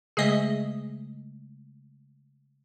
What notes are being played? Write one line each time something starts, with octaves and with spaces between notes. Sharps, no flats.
C#3 G#3 A3 G#4 D#5 E5